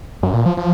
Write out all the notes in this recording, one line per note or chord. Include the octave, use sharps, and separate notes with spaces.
F#2
A#2
F3
F3